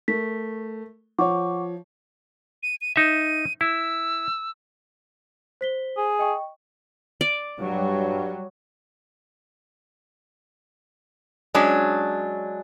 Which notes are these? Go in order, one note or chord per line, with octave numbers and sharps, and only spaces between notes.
A3 A#4 B6
F3 C#5 F#5 C#6 D6
D#7
D#7
D#4 E5 D#7
E4 E6
C5 B6 G7
G#4
D#5 G5 C#6
D5
G2 F#3 G3
F#3 G#3 C#4 D4